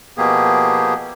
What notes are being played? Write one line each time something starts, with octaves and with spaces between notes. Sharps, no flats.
B2 F3 A#3 B3 G4 G#4